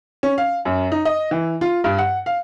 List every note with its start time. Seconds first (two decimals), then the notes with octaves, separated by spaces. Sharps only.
0.23 C#4
0.38 F5
0.65 F#2
0.92 D#4
1.05 D#5
1.31 E3
1.61 F4
1.84 G2
1.99 F#5
2.26 F5